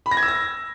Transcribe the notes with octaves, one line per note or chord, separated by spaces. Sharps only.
B5
A#6
G#6
E6
A#6